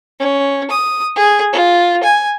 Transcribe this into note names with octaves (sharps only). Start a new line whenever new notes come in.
C#4
D#6
G#4
F4
G#5